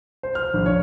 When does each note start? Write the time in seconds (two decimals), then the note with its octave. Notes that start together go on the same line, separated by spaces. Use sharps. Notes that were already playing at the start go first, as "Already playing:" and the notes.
0.23 C5
0.35 F6
0.54 A#1
0.66 C#5